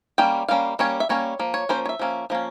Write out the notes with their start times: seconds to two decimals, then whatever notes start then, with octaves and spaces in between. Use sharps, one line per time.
0.18 G3 A#3 C#4 G5
0.48 G3 A#3 C#4 F5
0.79 G3 A#3 C#4 C#5
1.00 E5
1.09 G3 A#3 C#4 C#5
1.39 F3 A#3
1.54 C#5
1.69 F3 A#3 C#4 C5
1.85 C#5
1.89 E5
1.99 F3 A#3 C#4
2.30 F3 A#3 C#4